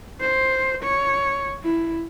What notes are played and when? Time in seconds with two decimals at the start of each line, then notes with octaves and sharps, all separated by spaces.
0.21 C5
0.83 C#5
1.64 E4